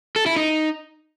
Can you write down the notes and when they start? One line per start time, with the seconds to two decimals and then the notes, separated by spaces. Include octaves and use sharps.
0.16 A4
0.26 E4
0.36 D#4